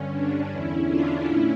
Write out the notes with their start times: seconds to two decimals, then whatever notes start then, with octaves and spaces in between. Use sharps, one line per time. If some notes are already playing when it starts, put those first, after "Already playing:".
Already playing: G2 D3 C#4
0.10 D4
0.48 E2 D3 C#4 E4
0.87 D4 F4
1.25 A2 C#4 E4